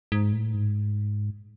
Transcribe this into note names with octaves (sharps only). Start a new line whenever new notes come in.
G#2
A2
G#2